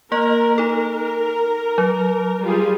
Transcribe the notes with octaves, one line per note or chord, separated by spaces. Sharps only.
A#3 A#4 D#5
D#4 A4 A#4
F#3
G3 F4 G#4